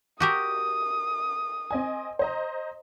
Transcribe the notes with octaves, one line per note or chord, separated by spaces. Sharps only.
F#4 G4 A#4 D#6
C4 D#5 G#5
C5 D#5 A#5